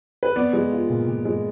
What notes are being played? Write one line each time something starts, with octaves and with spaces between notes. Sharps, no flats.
B4
B3 D5
G#3
F4
A#2
A#2
G#3